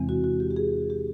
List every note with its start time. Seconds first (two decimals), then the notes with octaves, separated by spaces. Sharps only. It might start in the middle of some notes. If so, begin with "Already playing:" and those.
Already playing: E2 C3 E3 G#3 C4
0.09 F#4
0.24 F#4
0.40 G4
0.51 G4
0.56 G#4
0.90 G4